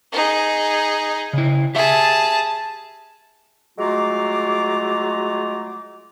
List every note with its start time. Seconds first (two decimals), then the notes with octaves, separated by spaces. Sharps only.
0.12 D#4 G#4
1.33 C#3 E4
1.75 G4 G#4 E5 A5
3.78 F#3 G#3 A3 F4 A#5 D6